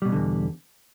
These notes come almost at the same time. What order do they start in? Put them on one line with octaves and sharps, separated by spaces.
G3 B2 F#3 D3 E2